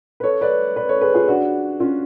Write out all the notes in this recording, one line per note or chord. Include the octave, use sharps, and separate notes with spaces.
B4
A4 C#5
B4 D5
B4 D5
A4 C#5
G#4 B4
F4 G#4
D4 F#4
C#4 F4